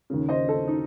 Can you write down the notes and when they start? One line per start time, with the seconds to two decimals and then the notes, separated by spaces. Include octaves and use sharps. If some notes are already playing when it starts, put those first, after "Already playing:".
0.10 D#2 C#3
0.29 C5 D#5
0.49 A4 C5
0.68 D#4